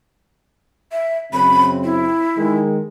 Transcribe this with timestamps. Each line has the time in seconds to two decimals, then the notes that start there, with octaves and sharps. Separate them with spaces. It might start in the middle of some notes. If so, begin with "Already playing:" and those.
0.92 E5
1.33 F#2 C#3 C4 B5
1.84 E4
2.38 D#3 G#3